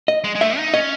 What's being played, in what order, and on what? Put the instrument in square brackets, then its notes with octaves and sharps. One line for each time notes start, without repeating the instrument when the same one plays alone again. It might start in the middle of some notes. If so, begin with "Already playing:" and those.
[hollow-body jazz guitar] D#5
[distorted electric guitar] G#3
G#3
[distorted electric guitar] A3 [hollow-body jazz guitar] E5
[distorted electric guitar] D#4
[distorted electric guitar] C#4 [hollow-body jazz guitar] D#5